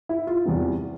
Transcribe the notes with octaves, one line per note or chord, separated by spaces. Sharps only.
E4
F4
E2 C3 E3 G3 B3